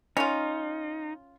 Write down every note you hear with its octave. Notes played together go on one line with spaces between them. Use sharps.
C#4 D#4 F4